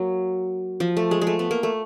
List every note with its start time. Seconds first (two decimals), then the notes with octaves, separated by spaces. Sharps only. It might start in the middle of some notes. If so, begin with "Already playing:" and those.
Already playing: F#3 A#3
0.80 F3
0.97 A3
1.11 G#3
1.21 G#3
1.27 A3
1.39 B3
1.51 A#3
1.63 A3